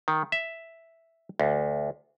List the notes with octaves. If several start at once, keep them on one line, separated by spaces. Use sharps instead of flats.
D#3
E5
D2